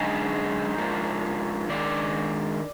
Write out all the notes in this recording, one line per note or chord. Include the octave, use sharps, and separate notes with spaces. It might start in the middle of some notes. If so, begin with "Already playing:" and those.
Already playing: F#2 D3 G#3 D#4 G#4
G#2 F3 A#3 D4
D#3 G#3 D4 D5